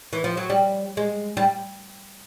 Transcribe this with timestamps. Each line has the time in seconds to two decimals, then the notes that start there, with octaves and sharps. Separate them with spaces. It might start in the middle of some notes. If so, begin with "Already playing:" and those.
0.13 E3
0.24 F3
0.37 F#3
0.50 G3
0.97 G#3
1.37 G3